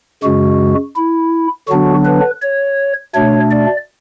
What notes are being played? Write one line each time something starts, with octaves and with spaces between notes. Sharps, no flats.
F#2 C#3 G#3 F#4
E4
D3 F#3 B3 D4 F#4
B4
C#5
B2 A3 D4 C#5
D5